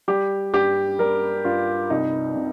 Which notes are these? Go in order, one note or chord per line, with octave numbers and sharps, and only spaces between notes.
G3 G4
G2 G4
G3 A#4
G2 F4
C2 D#4
C3